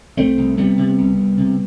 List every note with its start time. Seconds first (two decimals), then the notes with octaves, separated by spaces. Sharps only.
0.17 C2 A3 C4
0.38 C2
0.57 C3 G3 B3
0.77 C3
0.98 C2
1.18 C2
1.37 C3